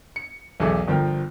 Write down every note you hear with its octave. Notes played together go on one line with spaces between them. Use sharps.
C#7
B1 E2 G#4 A4 E5 D6
G1 F3 A#4 G5